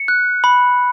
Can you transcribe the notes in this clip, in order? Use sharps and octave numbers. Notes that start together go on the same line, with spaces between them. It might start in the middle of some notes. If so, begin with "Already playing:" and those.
Already playing: C#7
F#6
B5